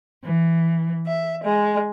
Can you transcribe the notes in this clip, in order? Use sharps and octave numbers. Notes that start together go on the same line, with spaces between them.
E3
E5
G#3